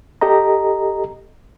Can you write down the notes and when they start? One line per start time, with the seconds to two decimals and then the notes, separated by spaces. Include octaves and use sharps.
0.21 G4 A4 D#5 A#5